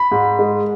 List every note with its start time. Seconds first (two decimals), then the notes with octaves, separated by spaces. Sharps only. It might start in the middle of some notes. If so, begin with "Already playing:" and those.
Already playing: B5
0.12 G#2
0.39 G#3